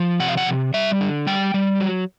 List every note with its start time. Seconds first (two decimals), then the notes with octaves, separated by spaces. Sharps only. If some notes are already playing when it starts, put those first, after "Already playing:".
Already playing: F3
0.20 C3 F#5
0.28 F5
0.37 F#5
0.47 C3
0.74 G3 E5
1.00 D3
1.27 G3 G5
1.54 G3
1.80 F#3